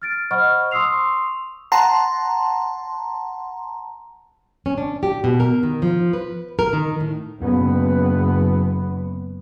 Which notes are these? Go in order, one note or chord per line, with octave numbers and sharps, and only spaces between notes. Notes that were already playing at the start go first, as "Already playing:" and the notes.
F6 A6 D7
C5 D#5 F#5 B5 C#6 F6
C6 C#6 D#6 E6 C7 F7
F#5 A5 A#5 C6
C#4
D4
G4
B2
A#4
D#3
F3
B4
A#4
D#3
A2
F#1 B3